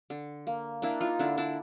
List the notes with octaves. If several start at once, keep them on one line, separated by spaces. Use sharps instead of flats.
D3
A#3
A#3 D4 E4
D#4 F4
D3 D4 E4
D4 E4